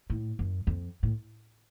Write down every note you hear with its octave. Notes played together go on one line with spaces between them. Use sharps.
A2
F#2
F2
A2